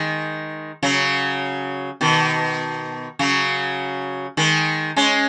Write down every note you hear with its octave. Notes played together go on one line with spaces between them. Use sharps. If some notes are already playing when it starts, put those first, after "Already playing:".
Already playing: D#3 G#3
C#3 F#3
B2 D#3
C#3 F#3
D#3 G#3
G#3 C#4